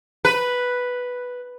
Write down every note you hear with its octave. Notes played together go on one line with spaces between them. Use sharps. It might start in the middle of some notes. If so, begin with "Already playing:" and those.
B4